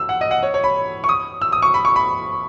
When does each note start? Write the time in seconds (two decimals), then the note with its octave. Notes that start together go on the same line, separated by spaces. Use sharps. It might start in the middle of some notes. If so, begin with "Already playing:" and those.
Already playing: E6
0.09 F#5
0.21 D#5
0.31 F#5
0.43 C#5
0.54 C#5
0.64 B5
1.04 C#6
1.09 D#6
1.41 E6
1.52 D#6
1.62 C#6
1.74 B5
1.85 C#6
1.96 B5